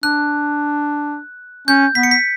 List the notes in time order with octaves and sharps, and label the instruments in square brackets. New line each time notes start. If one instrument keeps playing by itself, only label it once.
[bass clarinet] D4 [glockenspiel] F#6
[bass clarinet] C#4 [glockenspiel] G6
[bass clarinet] B3 [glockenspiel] B6
[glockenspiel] C#7
B6